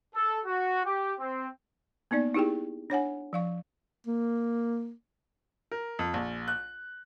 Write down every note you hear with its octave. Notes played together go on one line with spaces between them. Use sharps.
A4
F#4
G4
C4
A#3 B3 D#4 D5
D#4 E4 G4 G#4 G5
D4 C#5 F#5 G#5
F3 F5 C#6
A#3
A#4
F2
A#1
F#6